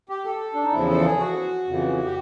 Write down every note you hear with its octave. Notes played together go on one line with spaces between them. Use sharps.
G4
A4
D4
D#4
E2 C#3 F3 E4
A4
G#4
F#4
F2 C#3 E3
G4